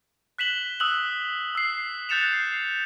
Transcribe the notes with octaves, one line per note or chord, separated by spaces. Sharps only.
F#6 B6 E7 F#7 G7
D#6 E6 F#6 F#7
E6 C7
E6
F#6 G6 A6 C#7 E7 F7
C7